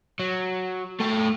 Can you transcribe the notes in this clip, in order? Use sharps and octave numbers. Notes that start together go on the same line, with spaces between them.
F#3
A3 G5